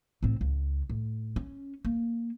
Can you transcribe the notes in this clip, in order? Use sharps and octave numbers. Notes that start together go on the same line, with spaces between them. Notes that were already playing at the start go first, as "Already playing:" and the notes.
A2 C4
C#2
A2
C#4
A#3